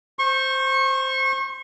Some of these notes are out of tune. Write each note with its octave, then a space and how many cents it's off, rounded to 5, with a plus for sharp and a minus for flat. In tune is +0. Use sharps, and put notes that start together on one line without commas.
C5 +0 C#6 -30